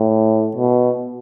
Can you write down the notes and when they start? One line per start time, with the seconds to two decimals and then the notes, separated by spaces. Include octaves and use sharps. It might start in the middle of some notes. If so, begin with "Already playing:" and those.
Already playing: A2
0.56 B2